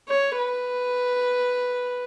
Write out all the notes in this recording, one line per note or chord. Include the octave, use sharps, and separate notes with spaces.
C#5
B4